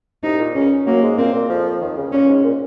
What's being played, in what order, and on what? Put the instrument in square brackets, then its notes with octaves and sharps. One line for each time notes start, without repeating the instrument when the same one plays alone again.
[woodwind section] C2 C3 [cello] D#4
[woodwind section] G#2
A#2
[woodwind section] C#2 C#3 [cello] C#4
[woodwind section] F#2 F#3 [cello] A#3
[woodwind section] G#2 G#3
[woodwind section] A#2 A#3 [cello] C4
[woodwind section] A#2 A#3
F2 F3
D#2 D#3
C#2 C#3
[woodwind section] A#2 [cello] C#4
[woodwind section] G#2
A#2